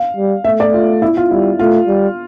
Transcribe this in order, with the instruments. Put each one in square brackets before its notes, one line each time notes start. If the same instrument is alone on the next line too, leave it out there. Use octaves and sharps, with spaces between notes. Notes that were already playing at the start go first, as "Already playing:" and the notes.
Already playing: [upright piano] F5
[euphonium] G3
[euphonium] A3 [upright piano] E5
[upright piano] D5
F4
E4
F4
[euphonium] G3 [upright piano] E4
[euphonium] A3 [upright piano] F4
[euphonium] G3